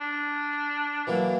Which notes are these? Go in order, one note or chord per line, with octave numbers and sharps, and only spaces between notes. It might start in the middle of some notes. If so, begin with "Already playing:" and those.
D4
E3 F#3 A#3